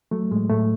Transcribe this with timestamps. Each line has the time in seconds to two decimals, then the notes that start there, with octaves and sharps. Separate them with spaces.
0.11 F#3 A3
0.32 A2 G#3
0.50 A2 A3